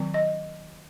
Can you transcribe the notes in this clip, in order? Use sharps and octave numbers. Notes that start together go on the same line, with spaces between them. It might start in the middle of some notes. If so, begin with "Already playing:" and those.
Already playing: D#3 F#3 C4
D#5